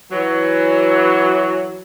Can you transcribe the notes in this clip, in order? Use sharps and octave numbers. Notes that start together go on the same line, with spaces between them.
E3 F#3